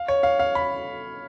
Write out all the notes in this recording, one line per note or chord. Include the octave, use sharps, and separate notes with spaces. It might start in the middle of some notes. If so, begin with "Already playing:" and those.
Already playing: F5
C#5
F5
F5
B5